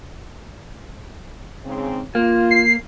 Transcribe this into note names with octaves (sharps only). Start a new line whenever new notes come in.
G#2 C#3 C4
A#3 F4
C7